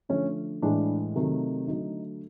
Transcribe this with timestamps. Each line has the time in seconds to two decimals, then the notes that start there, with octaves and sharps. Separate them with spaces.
0.09 D3 F3 A3 C#4
0.62 A2 E3 G#3 D4
1.16 C3 D#3 F#3 A3
1.67 D3 F#3 A3 D#4